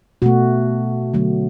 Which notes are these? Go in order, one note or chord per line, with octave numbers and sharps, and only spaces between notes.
B2 A3 F#4
D3 F#3 A3